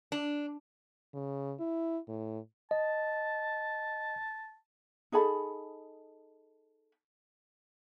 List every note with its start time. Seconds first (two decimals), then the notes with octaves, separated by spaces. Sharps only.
0.12 D4
1.14 C#3
1.59 E4
2.08 A2
2.71 D#5 A5
5.12 D#4 G#4 A4 B5